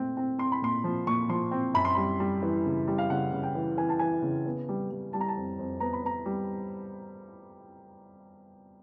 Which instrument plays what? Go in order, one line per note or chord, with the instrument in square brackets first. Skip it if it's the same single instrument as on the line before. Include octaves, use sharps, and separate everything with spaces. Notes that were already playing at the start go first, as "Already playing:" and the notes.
Already playing: [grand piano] A#2 A3 C4
C4
C4 C6
B5
A#2 C6
F3
A#2 C#6
F3 C6
C4
F#2 B5
C6
G3 B5
G3
E3
C#3
G3
F5
C#3 F#5
C#3
G5
E3
E3 G#5
A5
E3 G#5
C#3
B3
G3
G3
G3 A5
A#5
A5
F2
F2
B3 A#5
B5
B3 A#5
G3